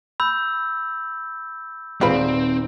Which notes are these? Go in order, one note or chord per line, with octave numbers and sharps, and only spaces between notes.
B5 E6 G6
D#1 G#3 C4 F4 B4 C5 C7